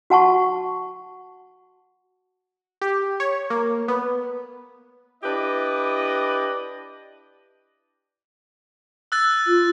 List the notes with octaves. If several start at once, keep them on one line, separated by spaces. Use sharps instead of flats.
F#4 F#5 A5 C#6
G4
C#5
A#3
B3
D4 E4 G4 B4 D5 D#5
E6 F#6 A6
F4